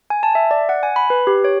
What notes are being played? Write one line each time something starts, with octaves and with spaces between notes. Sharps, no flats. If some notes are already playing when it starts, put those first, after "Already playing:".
G#5
A5
E5
D5
F#5
G#5
B5
B4
G4
C#5